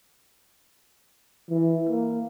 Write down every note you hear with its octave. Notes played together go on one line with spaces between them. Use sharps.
E3
A#3